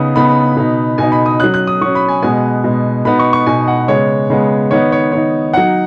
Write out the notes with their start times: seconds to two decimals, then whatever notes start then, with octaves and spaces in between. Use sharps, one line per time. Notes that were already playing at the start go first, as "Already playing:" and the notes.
Already playing: C#3 B3 D#4 D#6
0.15 C#3 B3 D#4 B5
0.56 B2 B3 D#4
0.98 B2 B3 D#4 G#5
1.12 B5
1.26 D#6
1.40 F#3 C#4 F#6
1.54 F#6
1.67 D#6
1.81 F#3 C#4 C#6
1.95 B5
2.08 G#5
2.23 B2 G#3 B3 G#5
2.64 B2 G#3 B3
3.05 B2 B3 D#4 B5
3.19 C#6
3.33 C#6
3.47 B2 B3 D#4 G#5
3.68 F#5
3.88 C#3 G#3 B3 C#5
4.30 C#3 G#3 B3
4.71 D#3 B3 D#4 C#5
4.92 C#5
5.12 D#3 B3 D#4 C#5
5.54 F#3 D#4 F#5